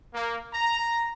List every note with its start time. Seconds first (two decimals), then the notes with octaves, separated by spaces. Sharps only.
0.14 A#3
0.54 A#5